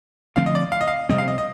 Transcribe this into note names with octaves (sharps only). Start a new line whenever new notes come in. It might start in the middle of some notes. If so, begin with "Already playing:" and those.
D3 F3 A3 C4 F5
D#5
D5
F5
D#5
F5
C3 G3 C4 D#5
F5
D#5
D#5